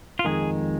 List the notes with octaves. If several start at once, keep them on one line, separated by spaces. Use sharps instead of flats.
F4
F2 D#3 G#3 G#4